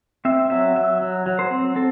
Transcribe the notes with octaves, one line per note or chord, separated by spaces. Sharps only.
C4 E5
F#3 E5
F#3 E5
F#3
F#3
C5
C4
C4 A4